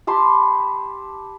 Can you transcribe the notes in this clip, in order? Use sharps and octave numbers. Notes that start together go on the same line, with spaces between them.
G4 A5 B5 C6